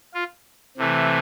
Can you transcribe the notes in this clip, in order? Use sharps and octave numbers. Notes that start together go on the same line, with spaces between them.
F4
C3 E3 A3